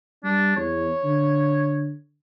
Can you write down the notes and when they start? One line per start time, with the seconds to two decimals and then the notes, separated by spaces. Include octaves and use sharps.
0.24 G3 D4
0.57 E2 C#5
1.04 D3